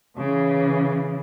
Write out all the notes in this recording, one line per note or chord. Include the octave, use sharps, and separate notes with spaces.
C#3 E3